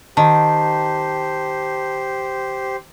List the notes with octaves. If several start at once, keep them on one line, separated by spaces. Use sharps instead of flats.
D#3 G4 C5 A5